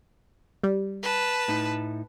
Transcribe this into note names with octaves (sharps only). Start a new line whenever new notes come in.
G3
B4 A5
A2 D#4